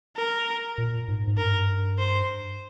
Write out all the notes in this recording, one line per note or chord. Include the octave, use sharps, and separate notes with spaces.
A#4
A#2
G#2
G#2
G2 A#4
C5